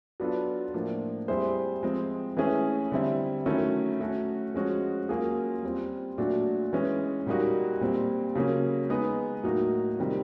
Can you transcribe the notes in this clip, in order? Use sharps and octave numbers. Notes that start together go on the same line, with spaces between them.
F#3 B3 D4 F4 A4
A2 F3 A#3 D4
G3 C4 E4 G#4 C5
F3 G#3 C4
E3 A3 C#4 E4 G#4
D3 G3 C4 E4
D#3 F#3 A3 C#4 E4
A3 C#4 F#4
F3 G#3 C#4 F#4
F#3 A#3 C#4 F4 G#4
G3 C4 F4
A#2 F#3 A3 D4 F#4
E3 G#3 C#4
A#2 G3 A#3 D#4 F#4
A#2 G3 C4
C#3 F#3 A#3 C#4
G#3 B3 D#4 G#4
A2 F#3 A#3 D#4 F#4
C3 D#3 G3 C4 F4